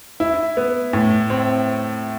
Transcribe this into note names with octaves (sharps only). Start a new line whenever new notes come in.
E4
B3
A2
C4